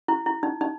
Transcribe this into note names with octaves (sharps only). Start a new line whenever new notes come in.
E4
E4
D#4
D#4